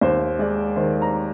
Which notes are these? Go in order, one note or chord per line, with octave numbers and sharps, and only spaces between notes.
D#2 C5
G#3 D5
D#3 C5
A#5